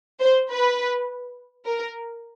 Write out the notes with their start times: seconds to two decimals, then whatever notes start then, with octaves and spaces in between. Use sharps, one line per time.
0.20 C5
0.49 B4
1.65 A#4